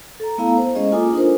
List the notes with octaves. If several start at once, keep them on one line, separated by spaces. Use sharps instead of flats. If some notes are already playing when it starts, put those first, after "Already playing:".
A4 A#5
A3 B3 E4 F5 A#5
C5
G#3 C#4 G#4 D#5
A#3 F4 A4 G#5 D6 D#6
D4 D#4 F4 A#4 C5